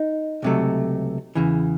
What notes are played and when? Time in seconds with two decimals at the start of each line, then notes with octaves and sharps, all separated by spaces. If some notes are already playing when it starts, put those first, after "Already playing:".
Already playing: D#4
0.43 C#2 C3 F#3 A3
1.35 E2 C#3 E3